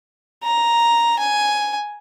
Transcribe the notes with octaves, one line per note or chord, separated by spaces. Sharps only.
A#5
G#5